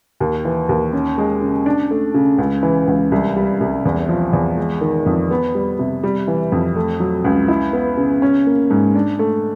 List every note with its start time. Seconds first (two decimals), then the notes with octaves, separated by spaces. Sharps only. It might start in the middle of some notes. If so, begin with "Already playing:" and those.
0.20 D#2
0.45 E3
0.69 D#2
0.93 C#4
1.18 G#3
1.41 C#3
1.66 D4
1.91 A3
2.14 C#3
2.38 C#2
2.63 E3
2.87 C#2
3.12 C2
3.36 G3
3.60 C2
3.85 E2
4.09 F3
4.33 E2
4.57 G#3
4.81 D#3
5.06 F2
5.31 B3
5.55 G3
5.79 C3
6.03 G3
6.28 E3
6.52 F2
6.76 A3
7.00 F#3
7.24 C#2
7.48 E4
7.73 B3
7.97 C#3
8.22 C#4
8.46 A#3
8.71 G#2
8.95 D4
9.19 A3